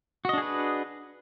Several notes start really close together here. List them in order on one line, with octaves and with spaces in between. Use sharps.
F#4 D#5 D4 G#4 B4